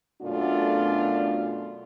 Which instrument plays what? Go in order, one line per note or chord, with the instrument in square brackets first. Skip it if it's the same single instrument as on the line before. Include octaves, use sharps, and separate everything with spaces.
[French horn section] F#2 B2 A3 D4 F4 D5